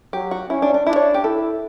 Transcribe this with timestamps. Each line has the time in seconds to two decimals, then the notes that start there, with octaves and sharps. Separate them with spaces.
0.13 F#3 G4
0.31 F#4
0.49 C#4 E4
0.62 D4
0.74 D4
0.86 D4 E4
0.96 C#5
1.14 G4
1.24 E4 A4